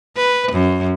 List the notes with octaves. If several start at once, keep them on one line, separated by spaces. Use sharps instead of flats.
B4
F#2